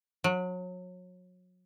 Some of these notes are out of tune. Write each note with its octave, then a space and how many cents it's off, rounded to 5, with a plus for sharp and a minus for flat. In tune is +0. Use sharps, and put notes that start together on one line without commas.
F#3 -30